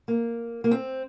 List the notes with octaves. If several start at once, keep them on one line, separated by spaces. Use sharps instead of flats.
A#3
A#3
C4